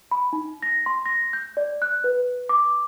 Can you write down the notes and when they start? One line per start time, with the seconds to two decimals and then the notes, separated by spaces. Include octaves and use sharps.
0.11 B5
0.33 D#4
0.63 A#6
0.86 C6
1.06 A#6
1.33 G6
1.57 D5
1.82 F#6
2.04 B4
2.49 D6